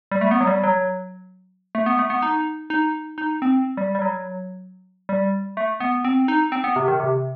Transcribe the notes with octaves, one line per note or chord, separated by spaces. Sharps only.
G3
A3
B3
F#3
G3
F#3
A3
B3
A3
B3
D#4
D#4
D#4
C4
G3
G3
F#3
G3
A3
B3
C4
D#4
C4
B3
C3
D#3
C3